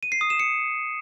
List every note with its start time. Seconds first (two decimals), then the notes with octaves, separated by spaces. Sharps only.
0.03 D#7
0.12 C7
0.21 D#6
0.30 E7
0.40 C#7